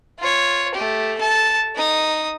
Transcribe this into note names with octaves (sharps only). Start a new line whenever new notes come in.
F4 C#5
A3 G4
A4 A5
D#4 D#6